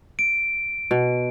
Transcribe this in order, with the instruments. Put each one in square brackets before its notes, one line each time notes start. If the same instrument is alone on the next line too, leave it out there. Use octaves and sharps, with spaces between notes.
[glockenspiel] D7
[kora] B2